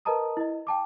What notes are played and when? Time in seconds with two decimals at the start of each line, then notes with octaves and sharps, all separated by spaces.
0.05 A#4 B4 D#5 A5 A#5 D#6
0.37 E4 D#5
0.67 G5 A5 D6